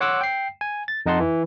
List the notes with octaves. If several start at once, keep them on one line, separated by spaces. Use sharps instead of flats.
C#5 F#5 C6 D6 E6 F#6
G5 C7
G#5
A6
F2 D#4 D#5 F#5 A5 C6
E3